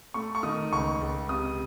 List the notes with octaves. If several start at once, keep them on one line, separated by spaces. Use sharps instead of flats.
A3 C#6
C#6
D#3 D#6
C#2 C#6
C#2
C3 D#6